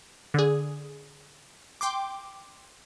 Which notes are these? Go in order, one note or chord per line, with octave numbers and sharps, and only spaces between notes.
D3 G#4
G5 C6 D6